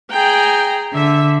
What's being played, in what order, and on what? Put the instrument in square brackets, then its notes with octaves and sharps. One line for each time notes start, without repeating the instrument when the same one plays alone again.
[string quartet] G#4 A#5 [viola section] G5
[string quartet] D3 [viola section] E5